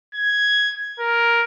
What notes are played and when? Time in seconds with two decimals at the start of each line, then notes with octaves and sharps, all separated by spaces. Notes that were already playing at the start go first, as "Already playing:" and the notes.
0.15 G#6
1.00 A#4